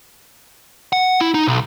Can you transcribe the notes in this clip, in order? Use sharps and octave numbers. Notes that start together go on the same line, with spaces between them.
F#5
E4
D#4
B1